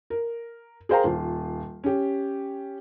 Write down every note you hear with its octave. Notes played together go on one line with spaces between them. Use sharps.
A#4
G#4 A#4 C5 F5 G5 A#5
D#1 F4
C#4 G4